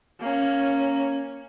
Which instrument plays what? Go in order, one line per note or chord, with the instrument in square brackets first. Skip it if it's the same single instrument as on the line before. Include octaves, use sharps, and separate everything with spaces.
[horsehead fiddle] A#3 C#4